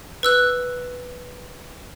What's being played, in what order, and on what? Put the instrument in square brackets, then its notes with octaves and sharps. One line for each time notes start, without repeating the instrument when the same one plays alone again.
[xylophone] B4 E6 F#6